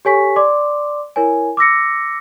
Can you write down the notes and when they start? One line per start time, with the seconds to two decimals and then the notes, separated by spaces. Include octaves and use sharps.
0.05 G4 A4 C#5 G#5 C#6 B6
0.36 D5 C6 D6
1.16 E4 A#4 C#5 G#5
1.57 D6 E6 A#6 C#7